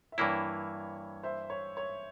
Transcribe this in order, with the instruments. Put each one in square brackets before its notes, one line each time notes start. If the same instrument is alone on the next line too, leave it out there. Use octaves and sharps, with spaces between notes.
[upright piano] E5
[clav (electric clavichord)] G2 E3 A#3 E4 [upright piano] C#5
[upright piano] C5 E5
C#5
C#5